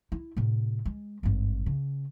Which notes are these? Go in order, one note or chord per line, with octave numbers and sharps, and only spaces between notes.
E4
A2 C3
G#3
G#1 G2
C#3